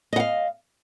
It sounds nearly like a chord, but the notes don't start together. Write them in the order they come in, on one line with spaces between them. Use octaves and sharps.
D#5 F#5 F5